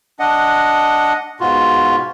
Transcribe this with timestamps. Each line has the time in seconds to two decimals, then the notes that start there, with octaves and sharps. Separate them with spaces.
0.19 D4 D#5 F#5
1.40 G#2 B2 F4 F#4